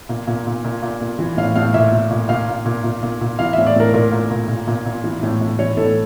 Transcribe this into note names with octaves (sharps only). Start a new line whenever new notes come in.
A#2
A#2
A#2
A#2
A#2
A#2
E3
A2 F5
A2 F5
A#2 E5
A#2
A#2
A#2 F5
A#2
A#2
A#2
A#2
A#2
E3 F5
A2 E5
D5
A2 A#4
A#2 A#4
A#2
A#2
A#2
A#2
A#2
E3
A2
A2
E3 C#5
A2 A4